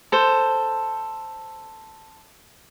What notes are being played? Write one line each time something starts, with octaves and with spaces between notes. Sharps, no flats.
A4 C5